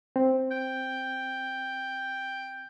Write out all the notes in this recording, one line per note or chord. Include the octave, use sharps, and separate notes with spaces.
C4
G5